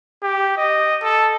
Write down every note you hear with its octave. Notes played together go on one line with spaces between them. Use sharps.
G4
D#5
A4